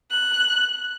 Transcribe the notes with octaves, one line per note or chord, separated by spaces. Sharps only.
F#6